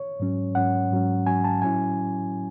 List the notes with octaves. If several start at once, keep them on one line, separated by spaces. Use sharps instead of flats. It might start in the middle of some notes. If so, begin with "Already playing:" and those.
Already playing: C#5
G#2 F#3 C#4
G#2 F#3 C#4 F#5
G#2 F#3 C#4
G#2 F#3 C#4 G#5
A5
A2 F#3 C#4 E4 G#5